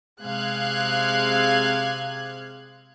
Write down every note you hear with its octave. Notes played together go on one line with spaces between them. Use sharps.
C3 G#3 F5 F#6 G#6